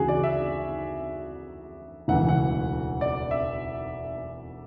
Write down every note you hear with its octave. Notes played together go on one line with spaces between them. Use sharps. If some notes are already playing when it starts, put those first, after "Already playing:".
Already playing: D2 C#3 E3 F#4 G#4
D5
E5
E1 D2 C#3 E3 F#5
F#5
D5
E5